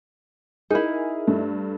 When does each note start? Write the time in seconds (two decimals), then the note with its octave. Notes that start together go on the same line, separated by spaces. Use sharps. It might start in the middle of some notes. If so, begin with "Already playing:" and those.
0.70 D#4 E4 G#4 A#4
1.27 G2 A3